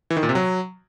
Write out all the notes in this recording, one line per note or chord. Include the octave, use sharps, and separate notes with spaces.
E3
D#3
A#2
C3
F#3